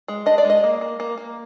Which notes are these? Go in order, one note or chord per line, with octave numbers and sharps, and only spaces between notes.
G#3
D4 D#5
D5
G#3 D#5
A#3
A#3
A#3
A#3